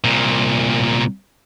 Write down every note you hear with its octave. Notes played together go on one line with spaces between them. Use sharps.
C2 A#2